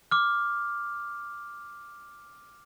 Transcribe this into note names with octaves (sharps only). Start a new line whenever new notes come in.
D6 F6